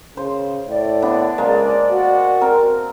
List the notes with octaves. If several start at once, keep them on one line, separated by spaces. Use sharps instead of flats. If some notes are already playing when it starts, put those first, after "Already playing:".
C#3 C5
A2 D5
D3 B3 D4
C#2 G#3 A#3 C5
F#4
C4 A#4